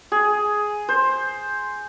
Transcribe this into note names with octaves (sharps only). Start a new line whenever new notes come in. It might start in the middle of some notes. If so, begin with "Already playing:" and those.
G#4
C5